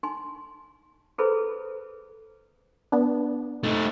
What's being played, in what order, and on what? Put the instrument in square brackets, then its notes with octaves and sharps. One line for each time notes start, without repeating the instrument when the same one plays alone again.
[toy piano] D#4 G#5 C6
E4 G#4 A4 B4 C5 B5
[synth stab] B3 D4
[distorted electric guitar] A3 D#4